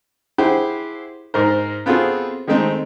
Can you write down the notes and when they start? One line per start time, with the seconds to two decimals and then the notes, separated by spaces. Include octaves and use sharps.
0.38 E4 G4 G#4 C5 F#5
1.34 G#2 A#4 C5
1.86 B3 C4 F4 F#4 G#4 A4
2.47 D#3 G#3 A3 C4 D#4